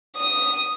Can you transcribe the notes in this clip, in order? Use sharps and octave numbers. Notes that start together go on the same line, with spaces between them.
D#6